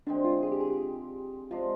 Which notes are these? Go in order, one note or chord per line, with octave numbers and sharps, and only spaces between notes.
D3 G#3 C4 D4
F4
G#4
G4
G#4
G4
F3 G#3 D4 F4